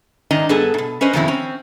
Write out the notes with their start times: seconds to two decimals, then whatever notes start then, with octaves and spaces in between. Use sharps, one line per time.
0.31 G#2 D#3 D4 D#5 A#5
0.49 G2 B3 G#4 A4 A5
0.74 G#2 B2
1.01 C#4 B4 C5 D#5
1.13 F2 B2 D#3 G#3 C4 E4
1.28 C4 C#4